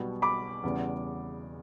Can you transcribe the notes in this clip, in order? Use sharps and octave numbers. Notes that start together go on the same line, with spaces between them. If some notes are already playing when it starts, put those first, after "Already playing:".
Already playing: B1 B2 G3 B3
B5 D6
E2 C#3 G3 B3